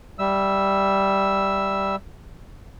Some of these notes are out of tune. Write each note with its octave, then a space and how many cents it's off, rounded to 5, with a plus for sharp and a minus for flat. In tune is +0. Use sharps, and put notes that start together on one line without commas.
G3 +0 E5 +0 E6 +0